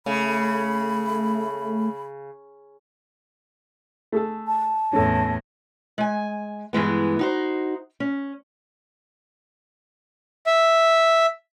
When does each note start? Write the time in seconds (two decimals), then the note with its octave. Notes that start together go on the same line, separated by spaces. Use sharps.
0.06 C#3 A3 B5
4.12 A3 G#4 A4
4.47 A5
4.93 E2 A2 C#4 A4
5.98 G#3 G#5
6.73 G2 E3 G#3 B3
7.19 D#4 F#4 C5
8.00 C#4
10.47 E5